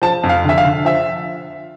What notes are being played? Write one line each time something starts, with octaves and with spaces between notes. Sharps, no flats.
F3 A5
F2
F5
D3 E5
F5
D3
F3 E5